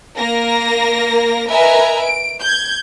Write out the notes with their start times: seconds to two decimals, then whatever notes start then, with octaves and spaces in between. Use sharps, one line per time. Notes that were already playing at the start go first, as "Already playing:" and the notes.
0.17 A#3 A#4 A#6
1.50 A#4 B4 D#5 E5 G#5 A#5
2.02 D7
2.40 G6 G#6